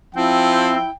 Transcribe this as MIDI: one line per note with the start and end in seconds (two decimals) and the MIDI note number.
0.15 0.83 53
0.15 0.77 60
0.15 0.90 64
0.15 0.91 79